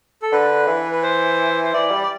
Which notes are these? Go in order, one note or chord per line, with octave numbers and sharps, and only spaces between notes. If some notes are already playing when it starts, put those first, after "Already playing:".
A4
D3 B4
E3
B4
C5
C5
E3 D5
G3
D5